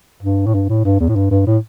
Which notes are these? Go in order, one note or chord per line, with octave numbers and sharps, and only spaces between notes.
G2
A2
G2
A2
G2
E2
A2
G2
G2
A2